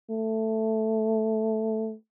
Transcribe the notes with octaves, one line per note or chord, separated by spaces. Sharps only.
A3